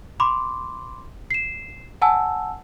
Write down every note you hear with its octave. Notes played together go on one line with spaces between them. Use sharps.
B5 C6 D6
C7 E7
F#5 G#5 A5 E6